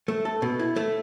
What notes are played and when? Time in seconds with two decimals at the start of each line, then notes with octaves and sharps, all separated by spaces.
0.08 A3
0.25 A4
0.42 B2
0.59 E4
0.76 A3